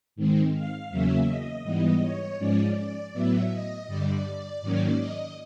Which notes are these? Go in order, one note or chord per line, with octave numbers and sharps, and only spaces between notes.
G#2 D#3 G#3 C4
F5
E2 C#3 F#3 A#3 C#4 E5
D#5
G#2 E3 G3 B3
C#5
G#2 F3 G#3 C#4 D5
D5
A2 F#3 B3 E5
D#5
G2 D3 G3 D5
G#2 D#3 F#3 A#3 C#4
D#5